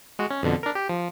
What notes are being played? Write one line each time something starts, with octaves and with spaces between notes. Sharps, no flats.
G#3 F#4
C#4
F2 B2 D3
D4 A#4
G4
F3